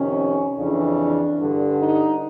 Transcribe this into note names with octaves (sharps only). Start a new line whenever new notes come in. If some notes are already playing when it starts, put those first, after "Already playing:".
Already playing: F2 C3 D#3 C#4
F2 C#3 E3 D4
G2 D3
D#4